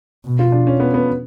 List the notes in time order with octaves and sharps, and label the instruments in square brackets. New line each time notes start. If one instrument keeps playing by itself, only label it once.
[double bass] B2
[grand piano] F4
D4
C#4
B3
B3